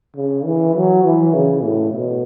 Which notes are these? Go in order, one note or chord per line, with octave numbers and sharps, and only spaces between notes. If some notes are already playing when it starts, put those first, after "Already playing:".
C#3
E3
F#3
E3
C#3
A2
B2